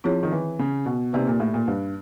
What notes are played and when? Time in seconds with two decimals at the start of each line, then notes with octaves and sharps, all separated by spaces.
0.04 F3 C4 E4 G#4 C#5
0.23 D#3
0.32 E3
0.59 C#3
0.86 B2
1.13 C3 A#3 D#4 G4 B4 D5
1.27 A#2
1.40 A2
1.54 A#2
1.68 G2